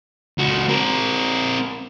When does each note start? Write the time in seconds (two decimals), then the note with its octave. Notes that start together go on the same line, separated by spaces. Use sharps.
0.38 C#2 F#4
0.68 C4 A#4